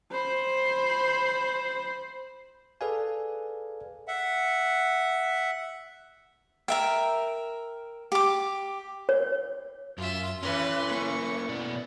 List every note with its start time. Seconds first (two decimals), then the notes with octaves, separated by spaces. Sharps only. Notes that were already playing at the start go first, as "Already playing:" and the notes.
0.11 C5 B5
2.81 G#4 A4 B4 D5 F5 G#5
4.08 E5 F#5
6.68 A#4 E5 G5
8.12 G4 D6
9.09 C#5
9.98 F#2 F4 E5
10.43 A2 E3 C#4 B4 C6
10.91 A#3 C#4 C#6
11.49 B2 B3 D5